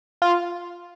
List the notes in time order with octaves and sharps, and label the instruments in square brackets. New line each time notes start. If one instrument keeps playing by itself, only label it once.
[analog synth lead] F4